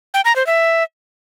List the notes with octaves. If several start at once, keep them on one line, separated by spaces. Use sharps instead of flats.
G5
A#5
C5
E5